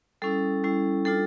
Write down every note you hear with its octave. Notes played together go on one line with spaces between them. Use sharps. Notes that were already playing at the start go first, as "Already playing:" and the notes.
G3 C#4 E4 A4
G3 C#4 E4
G3 D4 F4 A4